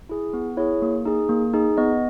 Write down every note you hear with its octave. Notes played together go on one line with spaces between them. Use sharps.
E4 G#4
B3
E4 G#4 C#5
A#3
D#4 G#4
A#3
D#4 G#4
B3 D#5